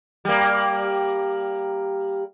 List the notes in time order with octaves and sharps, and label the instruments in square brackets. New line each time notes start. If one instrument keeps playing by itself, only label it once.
[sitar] G3 A#3